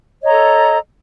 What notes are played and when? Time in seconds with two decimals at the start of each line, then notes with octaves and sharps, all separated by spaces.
0.21 C#5
0.24 D#5
0.28 A#5
0.31 A4